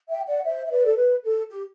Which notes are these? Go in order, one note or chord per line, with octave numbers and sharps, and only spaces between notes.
E5 G5
D5 F#5
C5 E5
E5
B4 D5
A4
B4
A4
G4